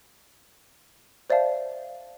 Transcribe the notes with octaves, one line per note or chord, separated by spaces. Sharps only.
C5 D5 E5 F5 A5